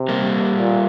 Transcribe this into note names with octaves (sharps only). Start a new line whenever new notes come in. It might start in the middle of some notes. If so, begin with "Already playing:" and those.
Already playing: C3
G3 A#3
A#2